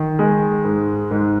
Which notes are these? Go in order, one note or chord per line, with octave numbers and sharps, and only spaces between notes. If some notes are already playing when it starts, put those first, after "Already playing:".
Already playing: D#3
G#3
G#2
G#2